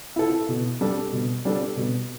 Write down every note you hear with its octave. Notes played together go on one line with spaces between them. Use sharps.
E4 A4
B2
G3 D4 A4
B2
G3 D4 A4
B2